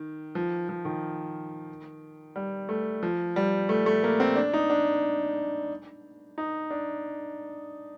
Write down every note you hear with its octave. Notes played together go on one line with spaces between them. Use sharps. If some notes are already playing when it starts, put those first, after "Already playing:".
Already playing: D#3
F3
F3
D#3
G3
A3
F3
G3
A3
A3
A#3
C4
D4
D#4
D4
D#4
D4